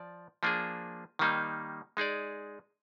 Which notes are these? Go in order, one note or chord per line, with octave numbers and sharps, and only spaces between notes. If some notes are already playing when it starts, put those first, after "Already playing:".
Already playing: F3 D5
F3 A#3 D4 G#4
D#3 G3 A#3 D#4
G#3 D#4 G#4 D5